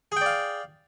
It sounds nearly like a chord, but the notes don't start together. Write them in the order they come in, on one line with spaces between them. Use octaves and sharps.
G#4 G5 D5 F5